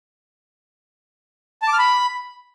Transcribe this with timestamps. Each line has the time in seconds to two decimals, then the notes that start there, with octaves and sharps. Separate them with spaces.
1.62 A5
1.68 D6
1.73 F6
1.79 B5